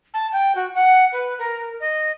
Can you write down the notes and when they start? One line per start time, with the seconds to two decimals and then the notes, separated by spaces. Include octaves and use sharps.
0.14 A5
0.32 G5
0.55 F#4
0.75 F#5
1.12 B4
1.39 A#4
1.80 D#5